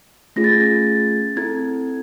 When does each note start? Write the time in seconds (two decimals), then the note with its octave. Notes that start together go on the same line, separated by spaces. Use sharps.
0.36 A3 C#4 F4 G#4 A#6
0.44 A6
0.52 G#6
0.60 A6
1.36 C4 E4 A4 G#6